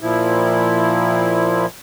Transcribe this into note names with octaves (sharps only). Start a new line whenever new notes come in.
A#2 F3 E4